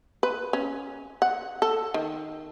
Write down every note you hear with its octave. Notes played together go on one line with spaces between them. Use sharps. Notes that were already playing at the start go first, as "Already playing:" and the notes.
B4
C#4
F#5
A4
D#3